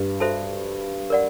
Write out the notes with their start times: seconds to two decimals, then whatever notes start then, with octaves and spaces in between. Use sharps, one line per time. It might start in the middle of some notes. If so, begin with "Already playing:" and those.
Already playing: G2
0.20 F#4 A4 C5 E5 A5
1.10 A#4 D5 F#5